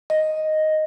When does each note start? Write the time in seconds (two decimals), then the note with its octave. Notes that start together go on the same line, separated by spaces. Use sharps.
0.10 D#5